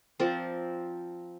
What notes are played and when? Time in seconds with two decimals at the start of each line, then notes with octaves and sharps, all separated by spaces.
0.20 F3 C4 A#4 D5